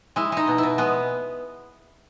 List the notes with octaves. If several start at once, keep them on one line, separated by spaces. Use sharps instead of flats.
G#3 E4
G#3 D#4
B2
E4
B2
G#3 B3